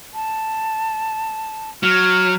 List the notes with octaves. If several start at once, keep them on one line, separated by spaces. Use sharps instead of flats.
A5
F#3 F6